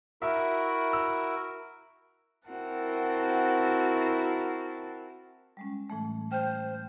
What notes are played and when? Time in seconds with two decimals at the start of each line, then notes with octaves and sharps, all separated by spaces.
0.22 E4 F#4 A#4 E5
0.93 E6
2.48 C4 E4 F#4 A#4 F#5 A5
5.57 G3 G#3 C#4
5.90 A2 E3 A3
6.32 C5 G5 F6